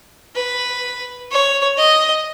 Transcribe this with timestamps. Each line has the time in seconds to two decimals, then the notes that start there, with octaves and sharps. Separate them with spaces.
0.35 B4
1.31 C#5
1.77 D#5